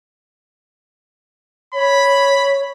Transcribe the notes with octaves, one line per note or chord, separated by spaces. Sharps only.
C#5 B5